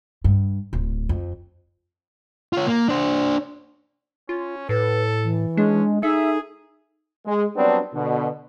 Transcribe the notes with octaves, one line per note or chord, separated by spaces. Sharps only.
G2
D1
F2
F4 C#5
A#3
D4 C5
C#4 F4
A2 A4 B4
E3
G#3 C#4 D4
D#4 G#4 A4 E5
G#3
F#3 G3 B3 C4 D4
B2 D3